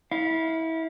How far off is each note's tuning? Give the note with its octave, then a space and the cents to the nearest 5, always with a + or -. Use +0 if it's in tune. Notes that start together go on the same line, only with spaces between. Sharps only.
E4 -25 F5 +0